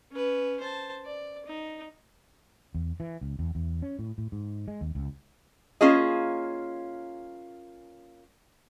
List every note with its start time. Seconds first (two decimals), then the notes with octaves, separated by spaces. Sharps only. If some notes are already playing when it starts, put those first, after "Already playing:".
0.12 C#4 B4
0.60 C5 A5
1.05 D5
1.46 D#4
2.75 E2
3.00 E3
3.21 C#2
3.39 E2
3.55 E2
3.82 C#4
3.99 A2
4.18 A2
4.32 G#2
4.68 G#3
4.81 D#2
4.95 C#2
5.81 A#3 C#4 F4 G#4 D#5